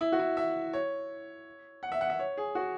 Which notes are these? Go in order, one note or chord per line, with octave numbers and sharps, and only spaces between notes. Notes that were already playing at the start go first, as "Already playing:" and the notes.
E4
F#4
E4
E5
C#5
F#5
E5
F#5
E5
C#5
G#4
F#4